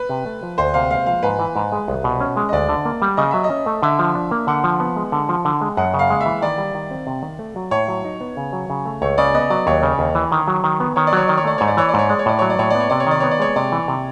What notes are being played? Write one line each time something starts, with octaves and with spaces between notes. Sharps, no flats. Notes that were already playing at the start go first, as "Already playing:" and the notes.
Already playing: B4
C3
A3
F3
D2 C5
C3 F5
G#3 F5
F3 F5
G#2 B4
E3
G#2
G#3
C2
B2
C#4
G#3
D#5
D2 D5
D3
A#3
G3
C#3 D#5
F#3 E5
D#5
C#4
A3
D3 E5
F3
D4
A#3
D3 F#5
F3
B3
G#3
D3
F3
D3
G#3
F#2 F#5
C#3
F5
G#3
E5
E3
D#3 D5
G3
D#3
C4
C3
D#3
A3
F#3
A2 C#5
F#3
D#4
B3
C#3
F#3
C#3
A3
C#2 C#5
C#3 D5
B3 D#5
F#3 D5
D#2 C#5
C#3
D#2
E3
D#3
F#3
D#3
B3
D#3 C#5
D5
F#3 C#5
D#3 D5
C#5
A3 D5
G#2 C#5
D5
E3 C#5
D5
G#2 C#5
G#3 D5
C#5
A2 D5
F#3 C#5
D5
A2 C#5
B3 D5
C#5
C3 D5
C#5
D#3 D5
B3 C#5
D5
G#3 C#5
C3 D5
E3
C3